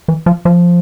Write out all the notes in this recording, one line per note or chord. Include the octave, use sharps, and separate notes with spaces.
E3
F3
F3